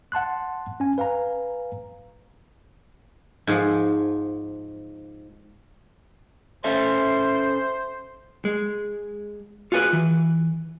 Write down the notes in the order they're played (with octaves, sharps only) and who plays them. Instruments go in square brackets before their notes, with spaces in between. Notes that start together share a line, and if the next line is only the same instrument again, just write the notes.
[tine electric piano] F#5 A5 C6 F#6
C#4 G#5
B4 F5 G#5 A#5
[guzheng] G#2 F3
[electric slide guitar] C#4 A4 E5 [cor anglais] C5
[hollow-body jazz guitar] G#3
F4 F#4 G#4 A4 B4
E3